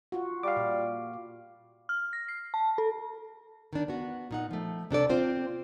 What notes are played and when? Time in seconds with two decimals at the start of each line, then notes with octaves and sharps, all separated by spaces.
0.12 F4 F#4
0.43 G3 F5 D6
0.57 A#2
1.89 F6
2.13 A#6
2.28 C7
2.54 A5
2.78 A4
3.73 D#3 D4
3.88 B3 F#4
4.31 A#2 D#4 F#5
4.51 F3 A3
4.91 C3 D4 A4 D5
5.10 C4 F4 C5